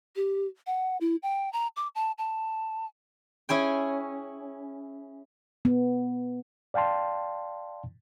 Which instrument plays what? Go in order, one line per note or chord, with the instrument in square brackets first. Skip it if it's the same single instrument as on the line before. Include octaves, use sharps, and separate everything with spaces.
[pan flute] G4
F#5
E4
G5
A#5
D6
A5
A5
[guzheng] C#4 E4 G#4 G5
[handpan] B3
[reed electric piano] D5 F5 G5 A5 C6